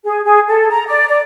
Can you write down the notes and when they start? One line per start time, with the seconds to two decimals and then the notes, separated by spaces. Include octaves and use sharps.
0.05 G#4
0.25 G#4
0.48 A4
0.71 A#5
0.88 D5
1.09 D5